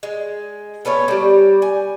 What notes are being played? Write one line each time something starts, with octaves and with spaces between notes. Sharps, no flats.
G#3
A3 B3 C#4 C#5
G3 G4
G#5